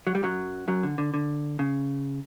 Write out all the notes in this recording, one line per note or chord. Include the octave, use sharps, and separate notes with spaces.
F#3
G3
F#2 F#3
F#2 F#3
D3
D3
D3
C#3